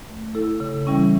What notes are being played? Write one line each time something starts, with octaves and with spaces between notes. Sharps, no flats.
A3
E4 A4
C#3
E3 G3 C#4 E4